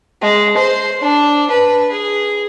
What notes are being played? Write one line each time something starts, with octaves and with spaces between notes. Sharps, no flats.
G#3
C5
D4
B4
G#4